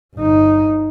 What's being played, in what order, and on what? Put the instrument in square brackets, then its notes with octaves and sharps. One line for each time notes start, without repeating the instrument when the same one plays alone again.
[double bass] G1 D#4